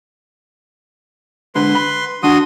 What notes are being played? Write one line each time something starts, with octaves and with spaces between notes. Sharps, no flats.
G#2 D3 B4 C6
B5
D#3 D4 F#4 C6 D#6